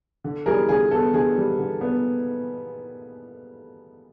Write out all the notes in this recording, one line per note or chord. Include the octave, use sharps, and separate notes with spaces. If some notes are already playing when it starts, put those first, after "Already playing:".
D3
G3 G#4 A#4
D3 G#4
B3 A4
D3 G#4
G3
D3
B3